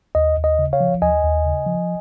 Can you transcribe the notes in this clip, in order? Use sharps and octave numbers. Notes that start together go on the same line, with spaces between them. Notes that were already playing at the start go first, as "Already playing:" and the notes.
D#2 D#5
D#2
D#5
C#3
C#5 F5
F3
D#2 D#5 G#5
D#2
C#3
F3